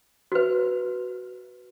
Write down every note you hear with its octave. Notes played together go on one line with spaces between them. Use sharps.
F#4 B4